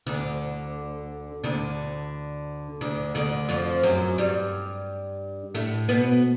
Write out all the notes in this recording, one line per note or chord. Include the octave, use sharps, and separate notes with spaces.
D2 D3
D2 D3
D2 D3
D2 D3
F2 F3
F#2 F#3
G2 G3
A2 A3
B2 B3